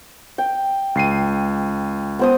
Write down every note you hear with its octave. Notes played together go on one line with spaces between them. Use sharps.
G5
C#2 C7 D#7
B3 C5 D#6